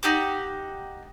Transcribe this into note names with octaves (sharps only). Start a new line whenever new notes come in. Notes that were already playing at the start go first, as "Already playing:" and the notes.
D#4 F#4 G4 D6